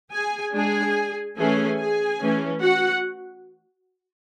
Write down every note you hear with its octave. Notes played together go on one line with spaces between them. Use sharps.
G#4 G#5
G#3 D4 G#4 G#5
E3 A3 C#4 G#4 G#5
G#4 G#5
E3 A3 C#4
F#4 F#5